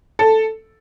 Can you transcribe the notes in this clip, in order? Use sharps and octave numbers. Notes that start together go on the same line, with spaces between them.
A4